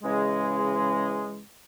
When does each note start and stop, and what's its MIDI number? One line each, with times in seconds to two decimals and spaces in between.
0.04 1.43 49
0.04 1.43 52
0.04 1.43 56